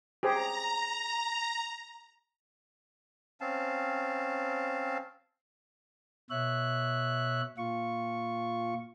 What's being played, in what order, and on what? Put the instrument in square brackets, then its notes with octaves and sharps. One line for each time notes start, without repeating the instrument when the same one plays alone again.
[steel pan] G4 G#4 C5 [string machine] A#5
[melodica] C4 C#4 F5 A5
[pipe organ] B2 C#5 E5 F#6
A#2 F4 C#6